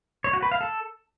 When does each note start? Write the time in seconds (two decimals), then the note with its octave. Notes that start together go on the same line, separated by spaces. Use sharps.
0.24 C#5
0.33 F#4
0.43 B4
0.52 F5
0.61 A4